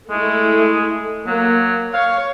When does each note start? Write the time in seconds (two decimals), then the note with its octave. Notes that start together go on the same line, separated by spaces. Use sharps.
0.11 G#3 A3 E4
1.27 F#3 A#3
1.94 C#5 F5